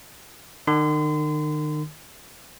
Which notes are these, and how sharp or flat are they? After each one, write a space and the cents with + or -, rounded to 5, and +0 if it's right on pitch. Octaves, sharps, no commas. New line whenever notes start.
D#3 -40 C6 -35